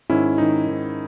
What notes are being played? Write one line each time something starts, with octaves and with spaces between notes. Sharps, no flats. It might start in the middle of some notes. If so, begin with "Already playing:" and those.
G#2 D#3 C#4 E4
G#2 D#3 D#4
G#2 D#3